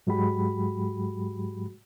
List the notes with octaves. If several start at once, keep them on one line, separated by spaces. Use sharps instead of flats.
G#2 F#3 G#3 F#4 G4 B5